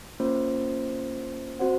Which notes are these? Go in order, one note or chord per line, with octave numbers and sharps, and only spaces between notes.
A#3 C#4 F4 C5
C4 F#4 C5 F#5